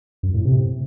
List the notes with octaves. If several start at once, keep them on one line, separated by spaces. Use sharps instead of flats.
F#2
A2
C3